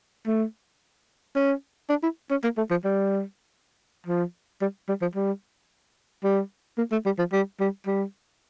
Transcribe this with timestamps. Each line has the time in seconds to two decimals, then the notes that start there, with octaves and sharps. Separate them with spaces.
0.27 A3
1.35 C#4
1.89 D4
2.03 E4
2.30 C#4
2.43 A#3
2.57 A3
2.70 F3
2.84 G3
4.06 F3
4.61 G3
4.88 G3
5.01 F3
5.15 G3
6.24 G3
6.78 A#3
6.92 A3
7.05 G3
7.18 F3
7.32 G3
7.60 G3
7.87 G3